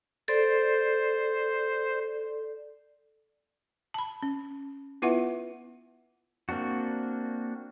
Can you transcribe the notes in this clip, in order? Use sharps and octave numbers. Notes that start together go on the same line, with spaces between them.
A4 C5 D5
A5 B5
C#4
B3 E4 F4 B4 E5 F#5
A#3 C4 D4 F#4